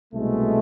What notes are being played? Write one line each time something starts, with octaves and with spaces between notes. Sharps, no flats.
C2 B2 G#3 A3